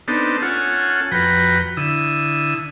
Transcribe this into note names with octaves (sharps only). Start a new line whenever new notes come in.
B3 C4 D4 D#4 A4
C#4 F4 A4 F#5 G#5
F2 F#4 B4 G5 A#5 B5
D3 E4 D#6 E6